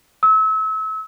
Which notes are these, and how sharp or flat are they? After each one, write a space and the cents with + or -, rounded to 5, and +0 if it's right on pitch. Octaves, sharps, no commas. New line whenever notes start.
E6 -35